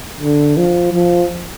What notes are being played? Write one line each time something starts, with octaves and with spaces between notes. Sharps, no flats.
D3
F3
F3